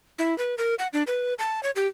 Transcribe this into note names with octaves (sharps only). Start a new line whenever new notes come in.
E4
B4
A#4
F#5
D4
B4
A5
C#5
G4